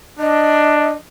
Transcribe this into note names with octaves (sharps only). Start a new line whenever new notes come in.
D4 D#5